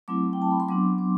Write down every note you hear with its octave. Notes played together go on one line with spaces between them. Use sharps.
F#3 A3 C4 E4 D6
G5
A5
B5
C6
F#3 B3 D4 D6
D6